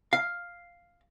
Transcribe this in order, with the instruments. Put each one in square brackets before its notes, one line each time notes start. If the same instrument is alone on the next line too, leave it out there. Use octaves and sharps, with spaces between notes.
[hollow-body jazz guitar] F5